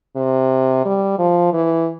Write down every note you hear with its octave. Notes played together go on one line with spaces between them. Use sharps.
C3
G3
F3
E3